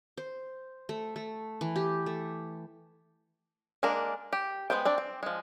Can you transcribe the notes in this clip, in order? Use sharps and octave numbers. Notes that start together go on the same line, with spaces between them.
C5
A3
A3
E3
G4
A3
G#3 A#3 D4 A#4
G4
G#3 A3 B3 C5 G5
C4 D4 D5
C4
F3 G#3